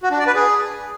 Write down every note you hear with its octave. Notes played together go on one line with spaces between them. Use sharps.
F#4
D4
D5
B4
G#4